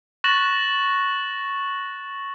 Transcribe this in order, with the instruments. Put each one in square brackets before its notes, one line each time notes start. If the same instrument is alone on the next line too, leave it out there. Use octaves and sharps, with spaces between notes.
[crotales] C#6 F#6 A6 A#6 E7 F#7